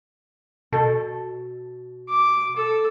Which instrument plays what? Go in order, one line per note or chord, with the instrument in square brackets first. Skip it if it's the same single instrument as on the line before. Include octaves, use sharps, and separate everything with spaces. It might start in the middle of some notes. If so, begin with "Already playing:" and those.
[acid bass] B2 [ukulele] A4
[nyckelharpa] D6
A4